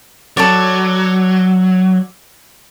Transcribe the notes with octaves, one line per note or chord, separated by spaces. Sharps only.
F#3 A4 C#5 D5